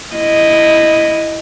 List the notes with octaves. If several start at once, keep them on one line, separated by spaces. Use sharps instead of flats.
E4 D#5